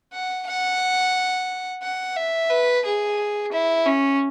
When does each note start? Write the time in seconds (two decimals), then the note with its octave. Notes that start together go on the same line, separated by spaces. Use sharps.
0.13 F#5
0.47 F#5
1.83 F#5
2.16 E5
2.50 B4
2.85 G#4
3.52 E4
3.86 C#4